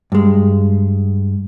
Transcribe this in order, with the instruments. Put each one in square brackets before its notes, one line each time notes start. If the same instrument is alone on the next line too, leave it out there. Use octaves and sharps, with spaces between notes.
[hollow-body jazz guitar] G2 G#3